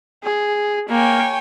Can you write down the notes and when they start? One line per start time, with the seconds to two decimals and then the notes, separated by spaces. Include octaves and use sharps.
0.24 G#4
0.89 A#3 C#5 G5 G#5